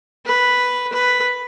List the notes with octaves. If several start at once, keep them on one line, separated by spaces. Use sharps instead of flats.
B4
B4